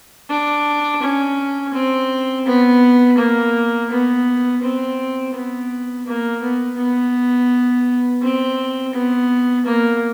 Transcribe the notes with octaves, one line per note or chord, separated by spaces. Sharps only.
D4
C#4
C4
B3
A#3
B3
C4
B3
A#3
B3
B3
C4
B3
A#3